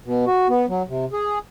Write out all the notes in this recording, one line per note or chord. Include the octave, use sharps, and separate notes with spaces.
B2
F#4
B3
F#3
C3
G#4